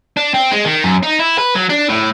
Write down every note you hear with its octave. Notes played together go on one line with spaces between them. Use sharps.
D4
C4
G#3
D#3
F#2
D#4
E4
B4
F#3
D4
A2